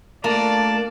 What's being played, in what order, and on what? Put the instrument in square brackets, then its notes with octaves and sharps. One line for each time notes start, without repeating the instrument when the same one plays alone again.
[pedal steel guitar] A3 F4 A#5 [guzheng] A#3 [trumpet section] D4 D5 [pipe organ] A5